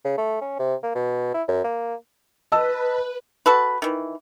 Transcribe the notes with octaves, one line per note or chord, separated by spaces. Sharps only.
C#3
A3
C#4
C3
A#3
B2
E4
F#2
A#3
B4 D#5 A5 E6
F#4 A4 B4
D#3 E3